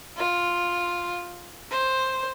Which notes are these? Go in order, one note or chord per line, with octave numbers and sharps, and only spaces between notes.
F4
C5